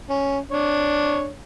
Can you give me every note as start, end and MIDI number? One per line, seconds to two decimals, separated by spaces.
0.10 0.38 61
0.51 1.29 62
0.51 1.29 73